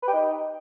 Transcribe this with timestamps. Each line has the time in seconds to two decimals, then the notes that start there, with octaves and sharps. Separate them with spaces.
0.03 B4
0.08 G4
0.13 D#4